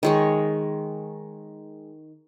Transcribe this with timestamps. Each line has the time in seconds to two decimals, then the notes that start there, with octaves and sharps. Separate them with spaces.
0.03 D#3 G#3 C#5